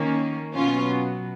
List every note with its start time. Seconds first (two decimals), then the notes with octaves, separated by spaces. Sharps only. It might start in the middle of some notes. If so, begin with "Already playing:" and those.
Already playing: D#3 A#3 C#4
0.54 B2 F#3 B3 C#4 F4